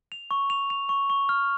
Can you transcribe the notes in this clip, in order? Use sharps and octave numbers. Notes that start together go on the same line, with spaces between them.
F7
C#6
F7
F7
C#6
C#6
F6